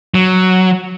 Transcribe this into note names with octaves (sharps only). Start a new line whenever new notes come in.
F#3